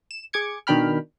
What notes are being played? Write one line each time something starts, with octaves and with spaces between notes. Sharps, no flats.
E7
G#4 D6 G#6 C#7
B2 D#3 D4 G5 B5 F6